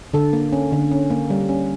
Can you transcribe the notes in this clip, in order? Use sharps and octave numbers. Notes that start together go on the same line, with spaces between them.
D3 A4
A#3
C#4
D3
C#4
A#3
G3
C#4